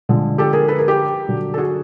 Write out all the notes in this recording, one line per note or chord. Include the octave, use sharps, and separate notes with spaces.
D3 F3 G#3
G4 A4
G#4 A#4
A4 B4
G#4 A#4
G4 A4
D3 F#3
A4
F#4 G#4